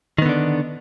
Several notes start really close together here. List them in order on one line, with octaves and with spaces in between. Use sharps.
D#3 B3 D3 D4